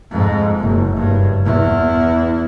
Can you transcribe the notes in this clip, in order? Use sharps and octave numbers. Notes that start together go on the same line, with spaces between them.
F2 G#2
F#1
F#1 G2
E2 E4